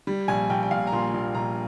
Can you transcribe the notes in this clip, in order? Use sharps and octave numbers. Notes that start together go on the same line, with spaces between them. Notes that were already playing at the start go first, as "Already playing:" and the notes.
G3
A#1 G#5
A#1 G5
G5
A#1 F5
A#5
A#2 C6
A#1
A#1 A#5